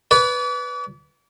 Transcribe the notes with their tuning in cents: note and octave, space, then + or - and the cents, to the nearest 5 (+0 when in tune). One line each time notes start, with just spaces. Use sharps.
B4 +0 D5 -40